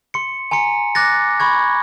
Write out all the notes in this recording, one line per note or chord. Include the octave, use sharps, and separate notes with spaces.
C6 C#7
G#5 A#5 C6 C#7
D6 F#6 A6 A#6
B5 C#6 G#6